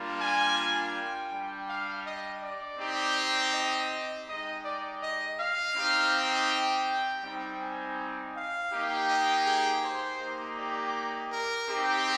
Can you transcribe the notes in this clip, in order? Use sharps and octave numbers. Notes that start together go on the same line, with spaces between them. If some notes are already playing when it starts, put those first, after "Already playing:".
Already playing: G3 A#3 D4 F4
G#5
G5
G3 D4 G4
F5
D#5
D5
C4 D#4 G4
D#5
G#3 D#4 G4 D#5
D5
D#5
F5
C4 D#4 G4
G5
G3 C4 D#4
G#5
F5
A#3 D#4 G4
D#5
G#4
C5
A#3 D#4 G4
D5
A#4
C4 D#4 G4